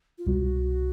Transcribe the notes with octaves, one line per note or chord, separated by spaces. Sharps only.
F4
C2 B2 G3 F#4